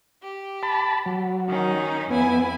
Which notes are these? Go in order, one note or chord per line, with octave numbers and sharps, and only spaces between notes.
G4
A5 B5
F#3
D#3 C#4 D#4
F2 B3 E4 G#5